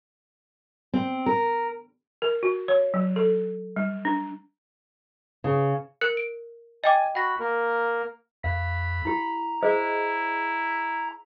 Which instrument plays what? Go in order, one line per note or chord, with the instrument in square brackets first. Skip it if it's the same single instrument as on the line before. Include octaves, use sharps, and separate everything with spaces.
[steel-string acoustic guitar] C4
A#4
[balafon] A#4
F#4
C#5
F#3
A4
G3
D4
[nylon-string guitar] C#3
[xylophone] A#4 F#6 C#7
D7
[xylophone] D#5 G5 D6 [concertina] G#5
[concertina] F#4 B5 [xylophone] F#5 A#6
[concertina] A#3 A#4
[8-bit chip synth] F2 [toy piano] F5 [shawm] B5
[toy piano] E4 G4 [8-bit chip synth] A#5
[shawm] E4 [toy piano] G#4 C5 D#5